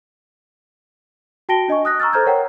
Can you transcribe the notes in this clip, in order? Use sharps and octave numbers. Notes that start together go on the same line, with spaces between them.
F#4 G5 A5 A#6 D7 G7
D4 D#5 G#5 C#6
D#6 F#6 A#6
A#5 C#6 E6 F6 A6
A4 C5 A#5 F6 G6 G#6
A#4 C#5 F#5 G5 A#5